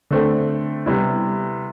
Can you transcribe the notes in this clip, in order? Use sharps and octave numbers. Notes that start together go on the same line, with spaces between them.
D3 A3 C4
C3 G3 B3 E4